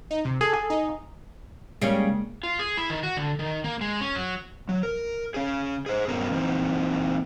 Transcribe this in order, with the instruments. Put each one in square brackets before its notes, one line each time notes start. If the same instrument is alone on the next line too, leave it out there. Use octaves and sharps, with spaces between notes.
[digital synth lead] D#4
C3
[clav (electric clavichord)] G#4 [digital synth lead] A4
[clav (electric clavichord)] G#4
[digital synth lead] D#4
[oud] C#3 G3 C#4 [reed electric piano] G#3 A#3
[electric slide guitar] F4
G#4
E4
D#3
F#4
D3
D#3
A#3
G#3
C#4
F#3
F#3
A#4
C#4 G#4
G#4 C5
G2 F#3 B3 C#4 A#4 A#5
E3 A#3 C4 D#4